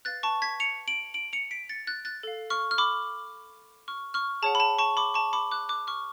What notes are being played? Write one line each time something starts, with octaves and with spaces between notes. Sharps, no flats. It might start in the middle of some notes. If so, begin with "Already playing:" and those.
B4 F5 F#6 A6
A5 C#6
G#6 B6
C#7 F7
D7 F#7
D7 F#7
C#7 F7
B6 D7
A6 C#7
F#6 A6
F#6 A6
A4 F5
C#6 F6
F6
B5 D6
C#6 F6
C#6 F6
G#4 C#5 F#5 A5
B5
A5
A5 C#6
B5 D6
A5 C#6
B5 D6
D6 F#6
D6 F#6
C#6 F6